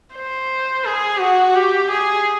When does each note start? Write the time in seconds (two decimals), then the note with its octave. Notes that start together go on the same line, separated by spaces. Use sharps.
0.15 C5
0.85 G#4
1.20 F#4
1.56 G4
1.91 G#4